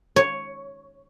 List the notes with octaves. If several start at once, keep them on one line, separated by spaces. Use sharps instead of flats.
C#5